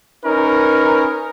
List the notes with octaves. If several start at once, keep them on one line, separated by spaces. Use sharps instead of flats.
C#4 D#4 A#4 B4